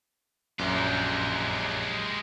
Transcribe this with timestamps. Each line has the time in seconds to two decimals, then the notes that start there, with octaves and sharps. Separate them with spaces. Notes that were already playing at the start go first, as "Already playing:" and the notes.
0.59 A#1 F#2 G#3 G4